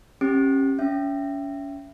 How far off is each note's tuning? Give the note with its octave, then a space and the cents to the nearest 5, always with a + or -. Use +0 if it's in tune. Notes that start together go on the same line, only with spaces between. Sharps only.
C#4 -30 G4 +0
C#4 +30 E5 +25